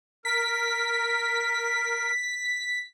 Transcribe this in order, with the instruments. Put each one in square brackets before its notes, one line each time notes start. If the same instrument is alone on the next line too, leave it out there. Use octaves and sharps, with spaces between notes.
[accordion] A#4 [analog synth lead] B6